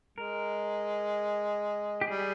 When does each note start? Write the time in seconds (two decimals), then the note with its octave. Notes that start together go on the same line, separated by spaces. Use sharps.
0.18 G#3 A#4
2.01 G4
2.07 G3 G#4